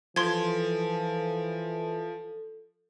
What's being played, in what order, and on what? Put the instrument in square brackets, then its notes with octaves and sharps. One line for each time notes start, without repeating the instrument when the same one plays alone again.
[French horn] E3 [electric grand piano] F3 [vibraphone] A4 [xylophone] C6 G#6